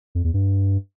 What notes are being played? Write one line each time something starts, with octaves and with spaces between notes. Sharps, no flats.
F2
E2
G2